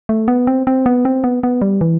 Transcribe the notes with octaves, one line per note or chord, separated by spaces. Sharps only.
A3
B3
C4
C4
B3
C4
B3
B3
G3
E3